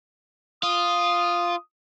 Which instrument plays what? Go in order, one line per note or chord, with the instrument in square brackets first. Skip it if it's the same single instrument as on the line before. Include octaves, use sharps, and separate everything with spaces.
[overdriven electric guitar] F4 [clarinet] D#6